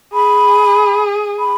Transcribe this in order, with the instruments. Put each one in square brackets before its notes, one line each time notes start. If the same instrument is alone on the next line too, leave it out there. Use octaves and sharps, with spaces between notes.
[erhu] G#4 [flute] B5
[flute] B5